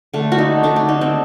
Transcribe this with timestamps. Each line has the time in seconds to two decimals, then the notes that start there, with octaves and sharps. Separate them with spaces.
0.14 D3 A3
0.32 F#4
0.38 D#4
0.63 D3 A3 D4
0.76 D4
0.89 D#4
1.01 C4